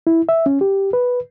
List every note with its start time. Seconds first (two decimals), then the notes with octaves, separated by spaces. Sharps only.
0.07 E4
0.29 E5
0.46 C#4
0.61 G4
0.93 B4